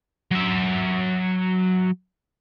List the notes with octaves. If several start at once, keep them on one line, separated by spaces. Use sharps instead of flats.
F#3 E5